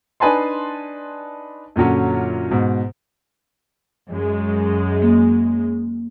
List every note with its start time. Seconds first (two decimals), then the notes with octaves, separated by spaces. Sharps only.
0.20 D4 D#4 B4 G#5 A5 C6
1.76 F#2 A#2 D3 F#3 C#4
2.51 G#2 B2
4.10 F#2 G#3
5.02 A#3